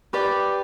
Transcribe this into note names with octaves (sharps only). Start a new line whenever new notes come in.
G4 B4 D5